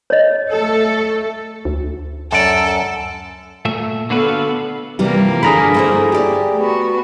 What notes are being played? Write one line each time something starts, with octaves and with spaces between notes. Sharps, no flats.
C#5 D#5
A3 A4
D2
F#2 A4 D5
A#2 A3 E5
D3 B3 F#4 A4 B4 F5
C3 E3 F3 G3 A#3
D3 D4 G#4 A#5 B5
A3 E4 C5
G4 D5
A3 B3 F#4